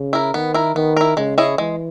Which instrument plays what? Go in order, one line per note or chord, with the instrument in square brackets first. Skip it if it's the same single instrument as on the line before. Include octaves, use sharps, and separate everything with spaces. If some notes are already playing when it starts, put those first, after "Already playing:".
Already playing: [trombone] C#3
[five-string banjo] E4 A#4
[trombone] D#3 [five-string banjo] B3
[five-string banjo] E4 A#4
[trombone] D#3 [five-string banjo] B3
[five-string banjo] E4 A#4
[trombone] C#3 [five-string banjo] G#3
[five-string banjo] C#4 E4 G#4 D#5
[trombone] E3 [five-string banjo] G#3